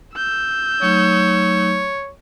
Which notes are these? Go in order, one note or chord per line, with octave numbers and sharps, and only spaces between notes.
E6 G6
F#3 A3 D#4 C#5